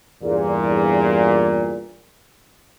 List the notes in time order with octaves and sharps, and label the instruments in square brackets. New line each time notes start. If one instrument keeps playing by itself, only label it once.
[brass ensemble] E2 G2 A#2